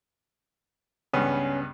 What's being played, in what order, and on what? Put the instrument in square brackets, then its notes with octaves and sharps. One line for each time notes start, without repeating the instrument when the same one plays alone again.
[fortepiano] C#2 G2 B3 [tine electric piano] C#4